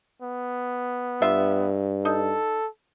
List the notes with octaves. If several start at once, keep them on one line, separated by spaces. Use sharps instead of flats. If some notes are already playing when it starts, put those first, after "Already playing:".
B3
G2 F4 E5
D#4 A4